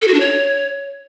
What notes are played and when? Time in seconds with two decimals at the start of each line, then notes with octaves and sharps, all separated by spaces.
0.02 A4
0.08 F#4
0.14 D4
0.20 C#5